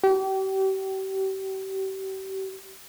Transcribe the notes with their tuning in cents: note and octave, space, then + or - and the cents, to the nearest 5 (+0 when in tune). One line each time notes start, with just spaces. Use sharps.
G4 -35